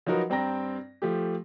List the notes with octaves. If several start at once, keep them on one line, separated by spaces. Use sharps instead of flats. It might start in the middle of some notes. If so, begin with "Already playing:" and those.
F3 F#3 D#4 F#4 A#4 B4
G2 C4 G5 A#5 A#6
F3 A3 G4